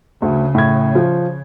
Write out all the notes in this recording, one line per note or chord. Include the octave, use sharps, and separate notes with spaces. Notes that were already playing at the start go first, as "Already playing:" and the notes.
D2 C#3
A2 G#6
F3